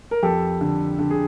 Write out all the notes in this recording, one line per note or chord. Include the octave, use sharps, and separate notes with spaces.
A#4
F2 G4 A4
D3
D3
G#4